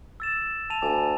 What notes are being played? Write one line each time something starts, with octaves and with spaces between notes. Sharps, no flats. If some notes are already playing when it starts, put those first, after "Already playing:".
E6 A6 E7
A5 D#7 F7
D2 G#5 D6